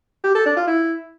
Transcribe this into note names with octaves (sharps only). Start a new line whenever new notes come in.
G4
A4
D4
F4
E4